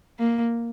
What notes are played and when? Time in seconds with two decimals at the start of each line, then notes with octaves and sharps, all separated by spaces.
0.19 A#3